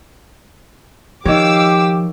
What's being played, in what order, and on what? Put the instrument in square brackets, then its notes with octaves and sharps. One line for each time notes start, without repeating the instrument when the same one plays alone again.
[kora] D#3 C#5 [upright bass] F3 [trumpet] G4 [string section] F5 D6 E6